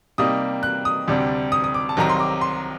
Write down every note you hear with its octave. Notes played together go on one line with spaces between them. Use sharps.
C3 G3 A#3 D#4 D#6
F#6
D#6
D2 C3 G3 D4
D#6
D#6
D6
A5
C2 C3 D#3 F#3 C4 A#5
C6
D6
C6